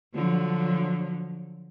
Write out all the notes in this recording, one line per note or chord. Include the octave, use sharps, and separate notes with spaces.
D3 F3 F#3